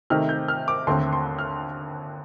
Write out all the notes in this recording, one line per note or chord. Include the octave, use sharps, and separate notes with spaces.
C3 D#3 A3 C4 D#4 F6
G6
F6
D6
D#2 D3 A3 C4 C6
C6
F6